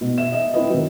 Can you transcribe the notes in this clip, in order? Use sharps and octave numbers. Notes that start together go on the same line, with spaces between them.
B2
E5 E7
D#5 E5
C4 E4 B4 D#5
D#3 F#3